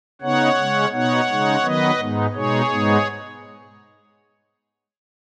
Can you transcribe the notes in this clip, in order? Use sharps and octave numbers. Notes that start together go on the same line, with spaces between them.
C#3 B3 D#4 C#5 F#5
C#3 G#3 C#4
B2 B3 D#4 C#5 F#5
C#3 G#3 D#4
D#3 F#3 B3 B4 D#5
G#2 G#3 B3 D#4
B2 G#3 D#4 G#4 C#5
G#2 G#3 B3 D#4